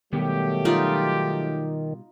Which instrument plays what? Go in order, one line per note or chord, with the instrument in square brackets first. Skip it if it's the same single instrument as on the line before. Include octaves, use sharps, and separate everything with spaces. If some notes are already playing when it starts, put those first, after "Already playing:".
[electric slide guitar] B2 G3 B3 [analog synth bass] D#3 [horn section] F#3 A3 G4
[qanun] D#4 F4 D5